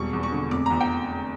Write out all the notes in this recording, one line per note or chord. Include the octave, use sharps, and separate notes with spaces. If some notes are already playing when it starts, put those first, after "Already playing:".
Already playing: E1 G3 C#6
E2
C#6
D3
F1 D6
E2 A#5
G5